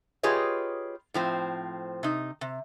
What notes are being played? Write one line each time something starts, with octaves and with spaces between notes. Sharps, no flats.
F4 G4 G#4 B4 C#5 D#5
A2 F3 C4
C3 D#4
C3